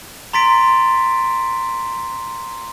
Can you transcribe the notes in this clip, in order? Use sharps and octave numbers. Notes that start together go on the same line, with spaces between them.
A#5 C6 A6 B6 D7